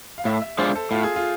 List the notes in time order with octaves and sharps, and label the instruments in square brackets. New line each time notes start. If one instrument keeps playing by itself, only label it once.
[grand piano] F5
[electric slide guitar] A2 [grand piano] E5
[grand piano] E5
[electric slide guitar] G#3 D4 F4 [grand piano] C5
[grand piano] A4
[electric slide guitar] A2 [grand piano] F4
[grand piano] G#4
F4